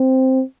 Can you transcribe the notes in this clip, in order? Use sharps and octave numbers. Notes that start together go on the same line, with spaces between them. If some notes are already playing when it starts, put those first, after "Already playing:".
Already playing: C4